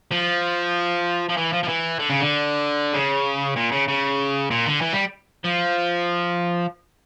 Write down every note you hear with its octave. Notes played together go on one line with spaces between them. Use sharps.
F3
F3
E3
F3
F3
E3
D3
C#3
D3
C#3
A#2
C#3
C#3
A#2
D3
E3
G3
F3